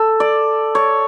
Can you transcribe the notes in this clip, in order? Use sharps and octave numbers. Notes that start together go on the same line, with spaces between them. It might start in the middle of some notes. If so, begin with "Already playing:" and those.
Already playing: A4
D5
C#5